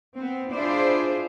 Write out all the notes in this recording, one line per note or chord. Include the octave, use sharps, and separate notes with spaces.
B3 C4
D4 E4 F4 G#4 C5 D5